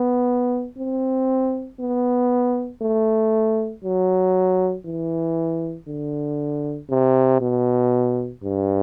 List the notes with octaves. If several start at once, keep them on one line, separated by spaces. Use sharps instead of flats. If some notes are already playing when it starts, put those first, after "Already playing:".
Already playing: B3
C4
B3
A3
F#3
E3
D3
C3
B2
G2